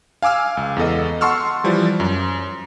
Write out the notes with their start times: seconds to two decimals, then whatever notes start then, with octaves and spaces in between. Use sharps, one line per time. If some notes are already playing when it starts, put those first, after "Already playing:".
0.22 F5 G#5 D6 E6 F6
0.57 C#2
0.77 E2 B3 A4 D#5
1.21 F#5 A5 C6 C#6 E6 F6
1.64 E3 F3 G3
2.00 F#2